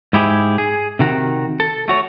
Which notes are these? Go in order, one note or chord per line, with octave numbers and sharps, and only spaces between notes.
G#2 E4 G4 G#4
G#4
C3 D#3 F#4
A4
A3 F#4 C#5